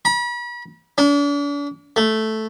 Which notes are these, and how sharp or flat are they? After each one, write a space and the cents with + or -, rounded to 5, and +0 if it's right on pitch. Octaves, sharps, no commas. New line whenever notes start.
B5 -40
D4 -40
A3 -5